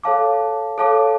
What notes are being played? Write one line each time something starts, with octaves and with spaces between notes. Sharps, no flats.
A4 C#5 F5 A5 D6
A4 C#5 F5 A5 D6